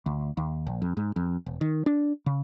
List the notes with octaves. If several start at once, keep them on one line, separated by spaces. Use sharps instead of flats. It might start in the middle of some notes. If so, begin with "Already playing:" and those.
D2
D#2
A#1
F2
G#2
F2
E1
D#3
D4
C#3